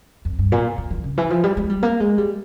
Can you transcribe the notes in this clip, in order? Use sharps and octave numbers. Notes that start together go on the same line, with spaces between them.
F2
G2
A#2
E3
E3
C#3
E3
F3
G3
G#3
G3
A#3
G#3
G3